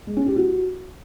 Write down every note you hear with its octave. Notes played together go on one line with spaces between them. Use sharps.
G#3
C#4
G4
F#4